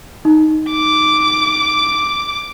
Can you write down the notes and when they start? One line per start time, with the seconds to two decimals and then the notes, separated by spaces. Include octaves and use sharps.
0.25 D#4
0.72 D6